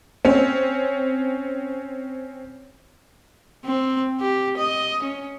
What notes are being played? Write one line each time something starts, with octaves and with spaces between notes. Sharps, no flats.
C4 C#4
C4
G4
D#5
C#4